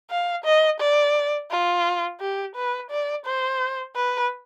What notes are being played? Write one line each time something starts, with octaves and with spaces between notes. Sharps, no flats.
F5
D#5
D5
F4
G4
B4
D5
C5
B4